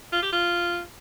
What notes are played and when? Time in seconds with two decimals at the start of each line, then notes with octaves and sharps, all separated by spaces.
0.12 F4
0.22 G4
0.32 F4